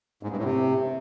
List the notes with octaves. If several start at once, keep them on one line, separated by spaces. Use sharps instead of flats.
G#2
G2
A2
C3